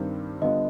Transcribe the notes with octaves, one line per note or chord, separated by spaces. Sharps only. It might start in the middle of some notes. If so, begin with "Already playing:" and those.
Already playing: G2 D#3 G3 C4
D3 G3 B3 F4 D#5